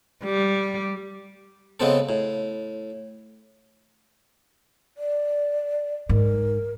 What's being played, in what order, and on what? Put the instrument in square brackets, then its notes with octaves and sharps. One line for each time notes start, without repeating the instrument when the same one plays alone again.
[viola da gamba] G3
[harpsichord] C#3 G#3 B3 C4 A4
A2
[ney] D5
[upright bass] G#2 [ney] A#4